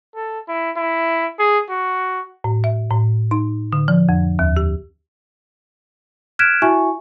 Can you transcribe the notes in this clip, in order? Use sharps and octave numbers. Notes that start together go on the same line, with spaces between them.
A4
E4
E4
G#4
F#4
A2
E5
A2
D#4
D3
F3
F2
D#2
G4
F6 F#6 G#6 B6 D7 E7
E4 F#4 E5 G#5 C#6